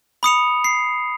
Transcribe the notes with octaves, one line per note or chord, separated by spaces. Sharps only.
B5 D#6 C#7 F7
C7